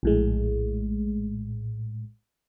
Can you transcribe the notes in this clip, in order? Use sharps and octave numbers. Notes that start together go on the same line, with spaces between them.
A#1 A2 G#3